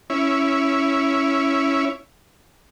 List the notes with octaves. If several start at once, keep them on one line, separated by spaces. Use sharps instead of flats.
C#4 E4